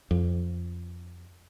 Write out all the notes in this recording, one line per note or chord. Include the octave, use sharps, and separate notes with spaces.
F2